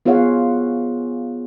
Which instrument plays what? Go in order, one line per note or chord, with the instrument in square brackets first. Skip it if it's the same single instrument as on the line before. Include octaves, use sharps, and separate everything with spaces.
[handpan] B3 F4 G#4 C#5 F5 F#5